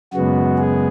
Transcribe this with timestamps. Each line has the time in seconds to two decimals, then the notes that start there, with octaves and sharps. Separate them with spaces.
0.13 F#2 C#3 G#3 B3 F#4
0.58 G#4